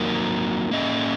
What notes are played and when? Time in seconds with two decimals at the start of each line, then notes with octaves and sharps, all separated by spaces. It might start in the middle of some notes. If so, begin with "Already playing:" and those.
Already playing: F#3 A#3 D#4 F#4 A#4
0.71 A#3 C#4 G#4 D#5